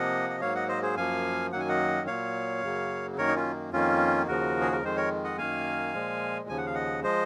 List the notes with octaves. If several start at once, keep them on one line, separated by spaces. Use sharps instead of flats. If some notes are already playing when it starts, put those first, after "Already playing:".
Already playing: C3 F3 A#3 D#5 F#5
D#5
G#2 F#3 A#3 C#5 F5
D#5 F#5
C5 D#5
G#4 C5
F#2 F3 A#3 F5 G#5
F#2 D#3 F#3 A#3 F#5
G#5
D#5 F#5
A#2 F#3 A#3 C#5 F5
F#2 C#3 F#3 A#3
F#2 D#3 A#3 A#4 C#5
D#4
C#4 F4
F2 D#3 A#3 C#4 F4
D#2 C#3 F3 F#4 A#4
G#4
A#4
F2 D#3 G#3 C5
A#4 C#5
D#5 F#5
F#2 D#3 A#3 F5 G#5
A#2 F3 G#3
D#2 C#3 F3 G#5
F#5
F5
D#5 F#5
F3 G#3 C5 D#5